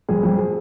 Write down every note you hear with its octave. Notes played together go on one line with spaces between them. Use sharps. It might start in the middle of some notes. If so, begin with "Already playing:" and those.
F2 G#4
F2
G#4